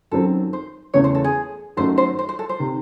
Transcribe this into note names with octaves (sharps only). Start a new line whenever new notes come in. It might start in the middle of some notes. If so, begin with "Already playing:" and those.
F#2 D#3 F#3 C4 A4
C5
E2 C#3 E3 A3 C#5
C5
A4
G#4
F#2 D#3 A3 D#4 F#4 C5
C5
C5
C5
A4
C5
C3 D#3